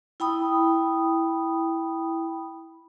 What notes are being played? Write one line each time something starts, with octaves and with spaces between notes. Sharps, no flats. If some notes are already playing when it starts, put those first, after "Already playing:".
E4 G5 B5 D#6